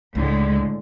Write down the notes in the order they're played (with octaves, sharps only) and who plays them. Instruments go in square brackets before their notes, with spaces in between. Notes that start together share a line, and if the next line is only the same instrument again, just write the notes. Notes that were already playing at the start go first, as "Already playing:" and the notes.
[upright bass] C#2 [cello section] A2 D3 G#3